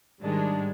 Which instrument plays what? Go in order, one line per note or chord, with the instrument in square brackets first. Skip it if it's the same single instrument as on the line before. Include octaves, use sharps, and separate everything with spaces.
[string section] G#2 D#3 G#3 D4 [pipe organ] G3